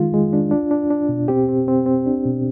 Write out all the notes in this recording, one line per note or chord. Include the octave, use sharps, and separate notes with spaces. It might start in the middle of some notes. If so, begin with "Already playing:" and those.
Already playing: D#3 G#3 F4
G#3
D4
D4
D4
D4
B2
C4 G4
C4
C4
C4
D4
B2